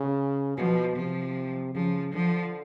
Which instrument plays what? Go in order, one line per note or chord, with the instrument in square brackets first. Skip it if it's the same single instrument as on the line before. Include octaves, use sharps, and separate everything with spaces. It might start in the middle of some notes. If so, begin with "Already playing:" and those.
Already playing: [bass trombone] C#3
[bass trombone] B2 [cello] F3
[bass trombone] C3 [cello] F3
[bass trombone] C#3 [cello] F3
[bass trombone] D3 [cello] F3